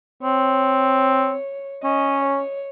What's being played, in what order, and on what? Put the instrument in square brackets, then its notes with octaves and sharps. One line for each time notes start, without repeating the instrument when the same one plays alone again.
[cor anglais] C4 [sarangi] C#5
[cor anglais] C#4 [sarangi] D#5
[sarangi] C#5